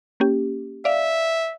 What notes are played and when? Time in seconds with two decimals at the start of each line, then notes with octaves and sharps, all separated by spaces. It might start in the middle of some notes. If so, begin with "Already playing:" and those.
0.20 A#3 C#4 G4
0.85 D5 E5 F5